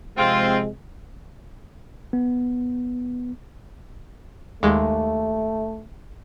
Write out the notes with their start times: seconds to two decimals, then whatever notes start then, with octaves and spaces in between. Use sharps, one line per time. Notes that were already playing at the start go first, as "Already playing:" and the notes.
0.17 C3 F3 G#3 C4 F4
2.13 B3
4.63 D#2 G#3 A3